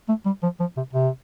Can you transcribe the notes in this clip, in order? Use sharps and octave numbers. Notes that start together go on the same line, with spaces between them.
A3
G3
F3
F3
C3
C3